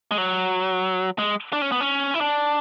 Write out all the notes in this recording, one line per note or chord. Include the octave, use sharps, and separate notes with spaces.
G#3
F#3
G#3
D4
C#4
B3
C#4
E4
D4